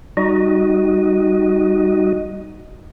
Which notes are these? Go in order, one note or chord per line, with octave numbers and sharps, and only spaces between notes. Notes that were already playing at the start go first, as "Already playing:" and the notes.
G3 D#4 F#4 D#5